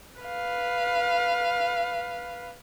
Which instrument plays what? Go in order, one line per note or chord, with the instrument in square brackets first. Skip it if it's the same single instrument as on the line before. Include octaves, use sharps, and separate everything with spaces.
[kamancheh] B4 F5